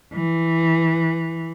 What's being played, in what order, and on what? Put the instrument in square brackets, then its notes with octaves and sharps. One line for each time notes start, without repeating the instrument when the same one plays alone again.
[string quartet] E3